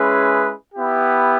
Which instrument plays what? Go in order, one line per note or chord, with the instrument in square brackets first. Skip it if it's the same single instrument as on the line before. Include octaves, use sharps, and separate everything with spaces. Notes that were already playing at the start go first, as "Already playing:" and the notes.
Already playing: [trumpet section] G#3 C#4 E4 G#4 B4
B3 E4 G4